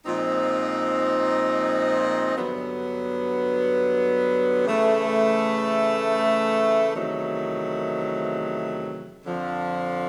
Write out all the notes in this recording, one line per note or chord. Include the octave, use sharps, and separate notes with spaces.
A#2 F3 G#3 C4 D#4
G2 D3 F#3 B3
C#3 E3 A3
E2 C3 D#3 F#3 A3
F2 D3 F3